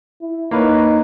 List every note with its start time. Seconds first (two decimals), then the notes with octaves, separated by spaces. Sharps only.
0.21 E4
0.51 A#3 D#4 B4 C#5